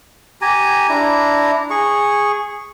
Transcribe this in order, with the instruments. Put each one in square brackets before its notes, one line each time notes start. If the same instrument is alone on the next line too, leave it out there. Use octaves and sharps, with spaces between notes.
[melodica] G4 G#5 A#5
D4 E4 A#5
G#4 C#6